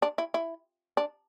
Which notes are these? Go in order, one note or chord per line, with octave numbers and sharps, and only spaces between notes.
D4
E4
E4
D4